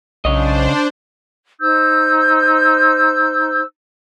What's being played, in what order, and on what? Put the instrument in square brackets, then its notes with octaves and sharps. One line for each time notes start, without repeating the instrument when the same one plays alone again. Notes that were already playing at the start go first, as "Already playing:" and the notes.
[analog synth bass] B1 [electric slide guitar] C#3 C#5 D#5 [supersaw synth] D4 C5
[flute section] D#4 C5 E6 G6